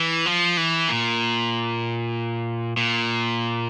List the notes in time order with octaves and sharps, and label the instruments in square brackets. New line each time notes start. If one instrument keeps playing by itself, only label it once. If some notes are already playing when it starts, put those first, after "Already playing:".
Already playing: [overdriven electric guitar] E3
F3
E3
A#2
A#2